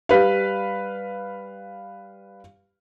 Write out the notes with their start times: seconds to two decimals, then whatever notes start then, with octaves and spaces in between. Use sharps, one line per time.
0.09 G3 B4 F5